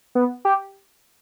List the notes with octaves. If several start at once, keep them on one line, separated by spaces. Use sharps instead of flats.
B3
G4